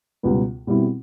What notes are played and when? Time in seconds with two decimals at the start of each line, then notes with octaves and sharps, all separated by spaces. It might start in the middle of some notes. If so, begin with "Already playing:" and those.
0.23 C#2 B2 G3 B3
0.67 B2 G3 C4 E4